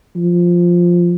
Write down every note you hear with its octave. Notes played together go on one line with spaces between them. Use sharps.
F3